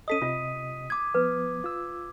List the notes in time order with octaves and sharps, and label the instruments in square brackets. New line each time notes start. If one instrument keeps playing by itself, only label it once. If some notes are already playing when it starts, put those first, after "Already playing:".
[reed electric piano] C#4 A4 D#5 [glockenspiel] D#6 B6 D#7
[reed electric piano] C3 D#5 [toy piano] F4
[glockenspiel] D6 G#6
[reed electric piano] F3 B3 [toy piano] B4
[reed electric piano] F4 E6